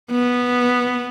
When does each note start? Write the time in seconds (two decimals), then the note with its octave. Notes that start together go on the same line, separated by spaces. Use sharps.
0.11 B3